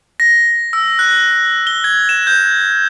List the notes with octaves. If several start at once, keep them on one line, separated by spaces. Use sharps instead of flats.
A#6
E6
F#6
G7
G#6
E7
G6